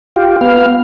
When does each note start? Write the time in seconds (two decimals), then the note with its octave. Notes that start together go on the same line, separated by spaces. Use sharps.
0.16 F4 G4
0.41 B3 F5